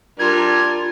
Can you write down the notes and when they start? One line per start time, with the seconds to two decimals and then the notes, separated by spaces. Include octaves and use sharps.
0.19 G3 D4 F4 A#4 G#6